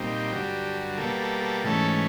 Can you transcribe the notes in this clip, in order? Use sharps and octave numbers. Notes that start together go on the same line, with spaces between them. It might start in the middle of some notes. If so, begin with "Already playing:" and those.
Already playing: A#2 G3 C4 D#4
G2 D3 F#3 G4
B2 G3 A#3 A4
A4
A4
G#2 E3 A3 C#4 A4